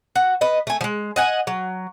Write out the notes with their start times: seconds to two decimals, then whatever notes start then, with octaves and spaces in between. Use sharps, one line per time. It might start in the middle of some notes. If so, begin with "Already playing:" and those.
0.16 F#4
0.41 B4 D#5
0.67 A3 G#5
0.81 F3 G#3
1.16 D#5 F#5 G#5
1.47 F#3